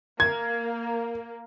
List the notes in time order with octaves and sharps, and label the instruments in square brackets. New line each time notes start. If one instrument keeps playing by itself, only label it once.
[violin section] A#3 [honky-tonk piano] G#6